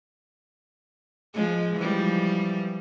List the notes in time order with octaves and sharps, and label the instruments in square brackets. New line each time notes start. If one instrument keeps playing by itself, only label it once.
[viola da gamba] F3 G#3
E3 F3 G3